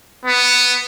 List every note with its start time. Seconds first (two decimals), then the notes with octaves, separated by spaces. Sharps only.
0.25 B3